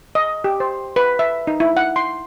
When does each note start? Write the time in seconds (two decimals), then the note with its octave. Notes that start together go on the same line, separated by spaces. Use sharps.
0.15 D#5
0.44 G4
0.60 C5
0.96 B4
1.19 E5
1.47 D#4
1.60 E4
1.77 F#5
1.96 C6